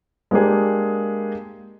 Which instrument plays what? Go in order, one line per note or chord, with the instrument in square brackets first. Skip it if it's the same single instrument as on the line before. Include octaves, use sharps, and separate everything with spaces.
[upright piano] G#3 A#3 D4 G4 G#4